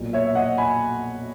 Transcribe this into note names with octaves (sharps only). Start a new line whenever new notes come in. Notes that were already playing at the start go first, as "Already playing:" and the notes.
Already playing: B1 A#2
C#5 E5
E5
D#5 F#5
G#5 B5